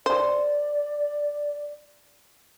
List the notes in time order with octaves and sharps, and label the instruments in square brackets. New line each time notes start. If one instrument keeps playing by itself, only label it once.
[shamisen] C5 [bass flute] D5